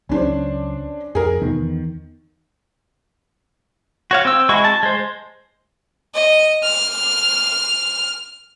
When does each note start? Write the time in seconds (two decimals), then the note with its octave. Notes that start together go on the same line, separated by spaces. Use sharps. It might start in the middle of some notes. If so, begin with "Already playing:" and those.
0.09 C#2 F#3 C#4 D4 C5
1.15 F2 G#4 A#4
1.42 E2 D#3 B3
4.11 F#4 C#5 F5
4.25 C4 E6
4.49 G#3 E4 F#4 C#6
4.64 A5
4.83 G#3 C5
6.15 D#5
6.64 F6